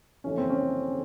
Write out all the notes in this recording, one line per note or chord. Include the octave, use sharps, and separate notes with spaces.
F#1 F2 C#3 E3 C#4
C4
C#4
C#3